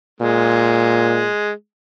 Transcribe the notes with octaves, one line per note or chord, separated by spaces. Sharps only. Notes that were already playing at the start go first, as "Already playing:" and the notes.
A#2 G#3